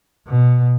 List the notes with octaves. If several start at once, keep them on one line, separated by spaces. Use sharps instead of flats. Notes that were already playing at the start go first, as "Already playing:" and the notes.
B2